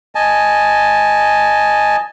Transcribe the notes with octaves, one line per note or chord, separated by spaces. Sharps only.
D#5 G#5 A5